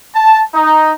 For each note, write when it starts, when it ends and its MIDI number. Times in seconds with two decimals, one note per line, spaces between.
0.14 0.42 81
0.54 0.91 63